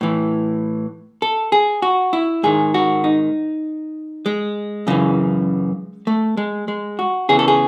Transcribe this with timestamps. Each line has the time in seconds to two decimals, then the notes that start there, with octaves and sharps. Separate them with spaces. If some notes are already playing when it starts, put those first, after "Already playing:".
0.01 A2 E3
1.22 A4
1.52 G#4
1.82 F#4
2.13 E4
2.43 G#2 D#3 G#4
2.74 F#4
3.04 D#4
4.26 G#3
4.87 F#2 C#3 E3
6.07 A3
6.37 G#3
6.68 G#3
6.99 F#4
7.29 E2 C#3 E3 G#4
7.39 A4
7.48 G#4